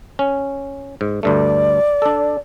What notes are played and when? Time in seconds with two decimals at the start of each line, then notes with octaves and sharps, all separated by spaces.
0.19 C#4
1.01 G#2
1.23 D2 G2 A3 D5
2.02 D4 A4